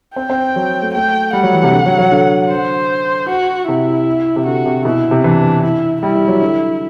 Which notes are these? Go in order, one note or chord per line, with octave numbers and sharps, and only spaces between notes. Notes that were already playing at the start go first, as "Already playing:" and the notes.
C4 G5
C4
F#3
A3
A3 G5
G3 F#5
F#3
E3
C3
D3
F#3
F#3
D3
C5
F#4
C3 E4
C3
D3 F#4
C3
B2 E4
C3
E3 D4
E4
G3 E4
G3
F#3
D3